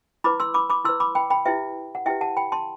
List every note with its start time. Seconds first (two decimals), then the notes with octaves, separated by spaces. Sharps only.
0.24 E4 B4 B5 D6
0.40 C6 E6
0.54 B5 D6
0.70 B5 D6
0.84 E4 B4 C6 E6
1.00 B5 D6
1.15 G5 B5
1.30 G5 B5
1.46 E4 G4 B4 E5 G5
1.95 F#5
2.06 E4 G4 B4 E5 G5
2.21 F#5 A5
2.37 G5 B5
2.52 A5 C6